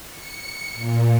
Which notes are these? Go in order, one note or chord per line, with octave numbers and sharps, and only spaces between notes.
C#7
A#2